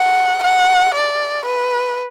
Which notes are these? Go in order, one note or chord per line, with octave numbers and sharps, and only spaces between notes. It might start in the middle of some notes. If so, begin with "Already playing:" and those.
Already playing: F#5
F#5
D5
B4